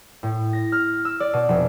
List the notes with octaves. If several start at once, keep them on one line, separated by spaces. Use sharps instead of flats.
A2
A#6
F6
E6
D5
B2
F1